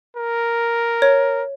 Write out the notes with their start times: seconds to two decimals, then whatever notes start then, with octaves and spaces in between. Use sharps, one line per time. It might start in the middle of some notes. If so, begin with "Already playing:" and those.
0.17 A#4
1.02 C#5